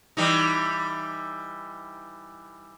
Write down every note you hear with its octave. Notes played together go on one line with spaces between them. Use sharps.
E3 G3 D#4